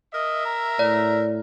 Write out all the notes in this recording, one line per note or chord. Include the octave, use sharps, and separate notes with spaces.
A#4 D#5 E5
A#5
A2 D5